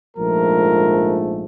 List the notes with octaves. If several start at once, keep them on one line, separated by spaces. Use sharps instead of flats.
A#1 G#2 F3 A3 A#4